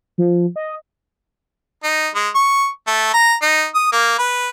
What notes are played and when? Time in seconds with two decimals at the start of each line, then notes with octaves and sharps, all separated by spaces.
0.18 F3
0.56 D#5
1.84 D#4
2.15 G#3
2.35 C#6
2.87 A3
3.14 A#5
3.42 D#4
3.75 D#6
3.93 A#3
4.19 B4